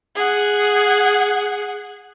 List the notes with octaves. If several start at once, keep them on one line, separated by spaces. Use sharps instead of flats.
G#4 F#5